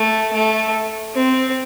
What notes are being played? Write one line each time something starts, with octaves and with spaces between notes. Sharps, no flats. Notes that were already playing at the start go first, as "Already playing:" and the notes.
Already playing: A3
A3
C4